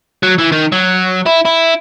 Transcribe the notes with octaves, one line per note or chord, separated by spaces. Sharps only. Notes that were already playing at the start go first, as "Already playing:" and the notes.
F#3
E3
D#3
F#3
E4
E4